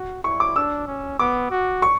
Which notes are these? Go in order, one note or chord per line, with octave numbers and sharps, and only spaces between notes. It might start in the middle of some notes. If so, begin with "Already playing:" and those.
Already playing: F#4
E4 C#6
D6
D4 E6
C#4
B3 D6
F#4
C#6